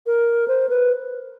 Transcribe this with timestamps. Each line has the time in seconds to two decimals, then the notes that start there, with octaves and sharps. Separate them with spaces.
0.06 A#4
0.48 C5
0.69 B4